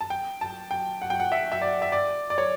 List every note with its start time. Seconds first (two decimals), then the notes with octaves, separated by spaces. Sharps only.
0.01 A5
0.10 G5
0.41 A5
0.71 G5
1.02 F#5
1.10 G5
1.20 F#5
1.32 E5
1.52 E5
1.62 D5
1.82 E5
1.92 D5
2.30 D5
2.38 C#5